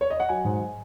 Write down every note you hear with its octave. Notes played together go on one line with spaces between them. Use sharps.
C#5
D#5
F#5
F#3 G#5
G#2